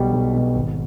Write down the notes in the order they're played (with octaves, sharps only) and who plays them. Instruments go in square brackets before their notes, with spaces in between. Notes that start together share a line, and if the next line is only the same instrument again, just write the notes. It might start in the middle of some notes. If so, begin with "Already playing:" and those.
Already playing: [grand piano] B1 B2 G3
B1
B2 G3
G#1